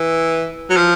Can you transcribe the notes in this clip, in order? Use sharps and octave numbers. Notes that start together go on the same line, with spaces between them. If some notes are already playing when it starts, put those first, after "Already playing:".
Already playing: E3
F#3
F3